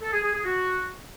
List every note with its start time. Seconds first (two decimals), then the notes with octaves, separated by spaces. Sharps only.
0.01 A4
0.12 G#4
0.23 G#4
0.33 G#4
0.44 F#4